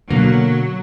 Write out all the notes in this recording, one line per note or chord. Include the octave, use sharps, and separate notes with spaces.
B2 D3 F#3 A#3